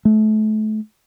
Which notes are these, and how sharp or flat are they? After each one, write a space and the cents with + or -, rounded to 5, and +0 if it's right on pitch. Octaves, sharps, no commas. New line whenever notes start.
A3 -30